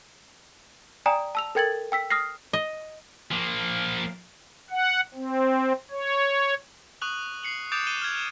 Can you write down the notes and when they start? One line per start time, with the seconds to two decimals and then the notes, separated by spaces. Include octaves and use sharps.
1.06 D5 G5 G#5 A#5 D#6
1.35 A5 E6 F7
1.55 A4 A#4 G5 G#6 A6 F#7
1.92 G5 E6 B6
2.10 D#6 F6 A#6 C7
2.53 D#5
3.31 F3 A#3
4.71 F#5
5.15 C4
5.91 C#5
7.01 C#6 D#6 F#6 F#7
7.43 C7 C#7 F#7
7.72 D6 D#6 G6 A6 D7 F7
7.87 D#7 E7 G7
8.02 F6 G#6